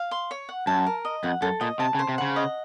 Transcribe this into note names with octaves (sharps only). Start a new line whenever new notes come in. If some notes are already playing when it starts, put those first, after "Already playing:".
Already playing: F5
C6
C#5
F#5
F#2 A5
A#4
D#5
F2 F#5
F#2 A4
A#2 D#5
C3 A5
C#3
C5
C3
C#3 F#5
D#5